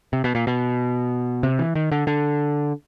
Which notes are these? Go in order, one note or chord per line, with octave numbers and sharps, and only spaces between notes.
C3
B2
A#2
B2
C3
E3
D#3
D3
D3